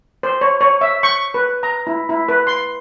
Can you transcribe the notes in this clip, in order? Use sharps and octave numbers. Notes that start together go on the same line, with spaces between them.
C5
C#5
C#5
E5
C#6
B4
A#5
E4
E4
B4
C6